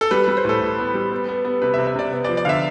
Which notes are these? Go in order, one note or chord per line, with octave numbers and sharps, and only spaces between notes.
A4
G3 B4
G3 B4
C5
A2 A4
A2
B3
G3
B3
B3
B3
C3 B4
E5
C3
E5
C3 D5
B3
D5
F3
D5
D3 E5 F5